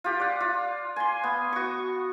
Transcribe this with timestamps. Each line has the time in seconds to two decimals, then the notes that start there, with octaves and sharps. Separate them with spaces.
0.04 F4 G4
0.20 D5 F#5
0.40 F4
0.96 G#5 C6
1.24 B3
1.52 F#4 C#6